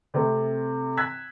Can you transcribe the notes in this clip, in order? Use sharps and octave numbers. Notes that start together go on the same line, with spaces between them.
C3 A3 C4
E6 F#6 G#6 B6